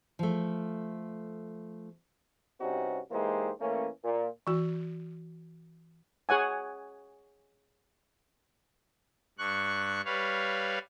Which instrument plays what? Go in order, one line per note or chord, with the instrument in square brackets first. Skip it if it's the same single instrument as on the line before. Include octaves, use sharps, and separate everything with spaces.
[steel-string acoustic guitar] F3 A3
[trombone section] G2 C3 C4 C#4 D#4 F#4
E3 G#3 A#3 D#4 G4 C5
E3 A3 A#3 C#4
A#2
[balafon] E3 F#4
[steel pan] G#4 C#5 F#5 G#5
[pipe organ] G2 C#6 F#6
G3 B4 C#5 F5